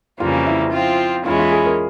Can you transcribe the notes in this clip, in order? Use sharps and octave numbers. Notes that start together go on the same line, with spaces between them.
F2 C#3 E3 G3 A#3 F4
E4
F3 C4 F4
E2 E3 G#3 C#4 E4 F4
F4
G#4
A#4